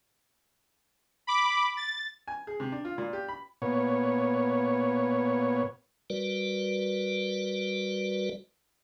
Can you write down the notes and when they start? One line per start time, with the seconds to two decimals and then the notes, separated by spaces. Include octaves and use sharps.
1.27 B5 D6
1.77 A6
2.28 G#5
2.47 G#4
2.60 C3
2.72 D4
2.85 F4
2.98 A#2
3.13 G4
3.28 B5
3.62 A#2 B3 C#5
6.10 G3 F#4 A#4 B4 D5